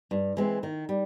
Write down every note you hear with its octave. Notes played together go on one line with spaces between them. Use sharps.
G2
E3 G#3 C4
D#3
G3